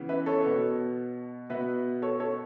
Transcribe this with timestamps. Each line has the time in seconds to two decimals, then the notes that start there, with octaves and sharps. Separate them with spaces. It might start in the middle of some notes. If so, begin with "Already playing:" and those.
Already playing: C#3 E3 B3
0.09 B4 E5
0.26 A4 C#5
0.44 B2 B3
1.50 B2 B3 B4 E5
2.02 A4 C#5
2.20 A4 C#5